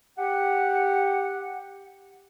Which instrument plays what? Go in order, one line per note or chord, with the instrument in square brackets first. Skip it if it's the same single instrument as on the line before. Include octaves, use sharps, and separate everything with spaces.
[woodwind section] G4 F#5